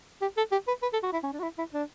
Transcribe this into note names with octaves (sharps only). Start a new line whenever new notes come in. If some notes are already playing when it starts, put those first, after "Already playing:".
G4
A4
G4
B4
B4
A4
F#4
E4
C#4
D4
F#4
E4
E4
D4